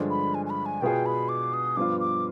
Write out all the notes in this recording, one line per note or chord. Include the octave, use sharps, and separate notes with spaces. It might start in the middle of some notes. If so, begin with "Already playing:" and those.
Already playing: G2 D3 F3 G#3 D4
B5
G#5
G#5
B5
G#5
B2 B3 F4 G#4 G5
B5
D6
D#6
G2 F3 B3 F4 D6
D6